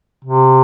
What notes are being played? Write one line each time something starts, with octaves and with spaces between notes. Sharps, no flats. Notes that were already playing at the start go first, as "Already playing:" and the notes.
C3